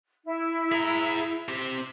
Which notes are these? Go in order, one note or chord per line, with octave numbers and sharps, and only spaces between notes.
E4
G#4 A#5
C4 G4